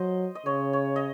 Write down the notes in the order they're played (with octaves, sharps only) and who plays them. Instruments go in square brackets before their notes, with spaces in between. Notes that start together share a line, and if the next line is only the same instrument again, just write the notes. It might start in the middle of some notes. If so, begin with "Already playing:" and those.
Already playing: [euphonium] F#3 [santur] C5 D#5
[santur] D#5
[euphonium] C#3 [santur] C#5
[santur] C#5
D#5